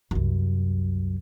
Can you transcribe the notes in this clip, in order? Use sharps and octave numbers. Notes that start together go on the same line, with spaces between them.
C2 F#2